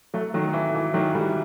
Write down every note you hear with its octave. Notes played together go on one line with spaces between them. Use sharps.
F#3 A3
D#3 F#3
E3
E3
D#3 F#3
E3 G3